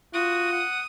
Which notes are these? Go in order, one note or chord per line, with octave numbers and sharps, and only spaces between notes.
F4 F#4 D#6
F#5